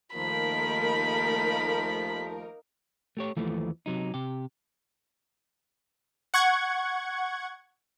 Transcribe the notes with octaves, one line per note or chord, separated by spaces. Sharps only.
D#2 F3 A3 A#3 D#4 A#4 B5
A3 G4 C#5
D#2 E3 F3 A3
C3 F#3 D#4
C3 G4
F#5 C#6 G#6